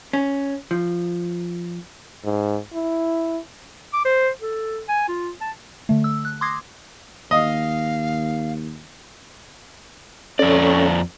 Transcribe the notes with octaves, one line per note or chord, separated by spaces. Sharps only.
C#4
F3
G#2
E4
D6
C5
A4
G#5
F4
A5
D3 A3
E6
F#6
C6 D6 D#6 G#6 A#6 C7
D#2 D#5 F5
F2 C#4 A4 C#5 D5